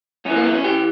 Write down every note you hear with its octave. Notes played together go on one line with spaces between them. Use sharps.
F#2 E3 C#4
A#3
B3
C#4
E3 G4